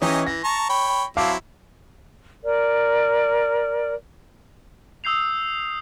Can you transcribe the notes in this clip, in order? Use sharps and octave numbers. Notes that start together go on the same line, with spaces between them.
E3 C#4 D#4 G4 D#5
E3 A#6
A5 A#5 C#6
C#5 G5 B5
F#3 C4 E4 F5 A5 D6
A#4 D5
D#6 E6 G6 C7 F7